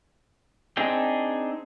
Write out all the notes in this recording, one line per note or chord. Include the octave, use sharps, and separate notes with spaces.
C4 D4 D#4 G#4 G5